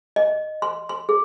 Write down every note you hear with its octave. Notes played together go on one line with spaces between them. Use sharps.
D#5
C6
C6
G#4